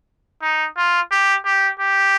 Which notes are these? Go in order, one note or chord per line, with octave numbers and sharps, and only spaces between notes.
D#4
F4
G4
G4
G4